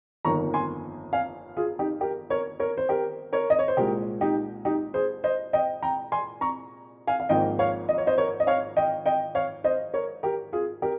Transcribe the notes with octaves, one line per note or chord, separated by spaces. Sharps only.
G1 F2 D#3 A#3 A#5 C#6
G#5 C6
F5 G#5
F4 G#4
D#4 G4
G4 A#4
A#4 C#5
A#4 C#5
C5
G4 A#4
A#4 C#5
D#5
C#5
C5
C2 A#2 G#3 G4 A#4
D#4 G4
D#4 G4
G#4 C5
C5 D#5
D#5 G5
G5 A#5
G#5 C6
A#5 C#6
F5 G#5
F5
G#1 G#2 F3 A#3 D#5 G5
C#5 F5
D#5
C#5
C5 D#5
A#4 C#5
D#5
C#5 F5
D#5 G5
D#5 G5
C#5 F5
C5 D#5
A#4 C#5
G4 A#4
F4 G#4
G4 A#4